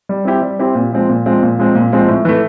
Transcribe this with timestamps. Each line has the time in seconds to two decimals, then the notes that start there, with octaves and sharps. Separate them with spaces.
0.09 G3
0.25 C4 E4 G4
0.42 G3
0.59 C4 E4 G4
0.75 A#2
0.92 F3 G#3 C4
1.09 A#2
1.26 F3 G#3 C4
1.43 A#2
1.59 F3 G#3 C4
1.75 A#2
1.92 F3 G#3 C4
2.08 A2
2.25 E3 A3